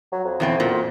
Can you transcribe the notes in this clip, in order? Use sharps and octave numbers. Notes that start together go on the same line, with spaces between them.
F#3
F2
E2 B2 C4
A#2